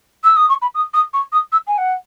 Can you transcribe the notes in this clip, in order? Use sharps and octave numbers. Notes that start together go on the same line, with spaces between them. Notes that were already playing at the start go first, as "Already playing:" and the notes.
E6
D#6
C#6
B5
D#6
D#6
C#6
D#6
E6
G#5
F#5